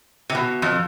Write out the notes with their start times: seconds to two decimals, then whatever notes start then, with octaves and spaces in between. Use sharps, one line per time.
0.30 C3
0.35 B2
0.62 F2